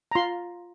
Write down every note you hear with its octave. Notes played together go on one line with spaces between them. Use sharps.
A#5
F4 C6